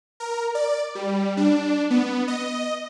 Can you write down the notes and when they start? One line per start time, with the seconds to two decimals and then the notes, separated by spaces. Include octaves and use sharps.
0.20 A#4
0.55 D5
0.95 G3
1.37 D4
1.90 B3
2.28 D#5